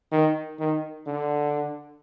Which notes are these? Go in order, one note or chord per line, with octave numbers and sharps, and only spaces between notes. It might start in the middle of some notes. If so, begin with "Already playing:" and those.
D#3
D#3
D3